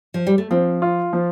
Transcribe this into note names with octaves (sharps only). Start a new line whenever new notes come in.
F3
G3
A3
F3 C4
F4
F3